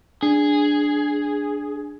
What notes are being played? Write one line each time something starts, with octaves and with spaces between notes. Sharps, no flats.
D4 G#4